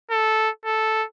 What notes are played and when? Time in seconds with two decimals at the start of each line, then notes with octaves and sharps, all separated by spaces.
0.11 A4
0.66 A4